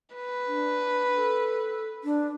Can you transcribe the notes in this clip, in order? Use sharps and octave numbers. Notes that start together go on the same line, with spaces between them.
B4
D4
A4
D4